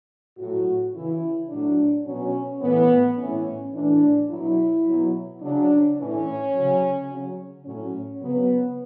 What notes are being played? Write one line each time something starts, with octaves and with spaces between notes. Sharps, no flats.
A2 F#3 F#4
C#3 E3 E4
A2 F#3 D4
B2 F#3 C#4
A2 E3 B3
A2 E3 C#4
A2 E3 D4
B2 F#3 E4
B2 F#3
C#3 F#3 D4
A2 E3 C#4
C#3 F#3
C#3 F#3
A2 F#3 C#4
C#3 F#3 B3